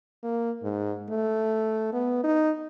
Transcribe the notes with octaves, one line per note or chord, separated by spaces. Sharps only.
A#3
G#2
A3
B3
D#4